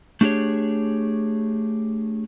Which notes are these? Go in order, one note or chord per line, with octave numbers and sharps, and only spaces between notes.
A3 D4 G4 G#4 C#5